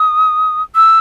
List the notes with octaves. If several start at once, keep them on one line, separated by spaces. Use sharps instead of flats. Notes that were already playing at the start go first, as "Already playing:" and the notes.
Already playing: D#6
E6